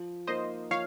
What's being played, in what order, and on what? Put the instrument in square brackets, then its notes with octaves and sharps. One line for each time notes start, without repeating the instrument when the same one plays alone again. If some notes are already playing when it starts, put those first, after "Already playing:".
Already playing: [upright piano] F3
[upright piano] A#3 D#4 [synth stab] C5 D#5
[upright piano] F3 [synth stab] C#5 F5